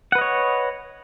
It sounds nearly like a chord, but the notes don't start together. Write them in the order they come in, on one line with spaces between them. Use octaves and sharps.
F#5 B4 D#5 C#5